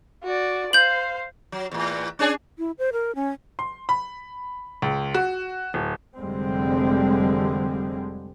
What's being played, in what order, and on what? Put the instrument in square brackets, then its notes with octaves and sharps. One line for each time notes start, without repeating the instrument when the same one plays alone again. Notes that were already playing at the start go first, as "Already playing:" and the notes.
[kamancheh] F#4 D5
[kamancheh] C5 F5 [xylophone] G6 F#7
[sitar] F#3
E2 A2
C#4 D4 G#4
[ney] E4
C5
A#4
C#4
[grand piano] C6
B5
C#2
F#4
D1
[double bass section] F1 D3 G3 G#3 C4